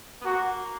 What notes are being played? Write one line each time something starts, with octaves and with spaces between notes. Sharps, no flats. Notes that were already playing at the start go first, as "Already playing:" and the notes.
B3
A#3 F#4